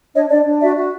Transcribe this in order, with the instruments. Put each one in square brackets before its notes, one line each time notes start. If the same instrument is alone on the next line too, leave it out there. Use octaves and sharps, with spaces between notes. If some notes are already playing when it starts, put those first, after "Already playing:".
[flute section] D4 C#5 D#5
D4 D5
D4
F#4 D5 E5
F#4